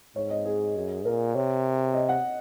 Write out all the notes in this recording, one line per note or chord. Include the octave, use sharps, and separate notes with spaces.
G#2 C#5
D#5
G#4
F#2
A#2 A#4
C3 C#5
D#5
F#5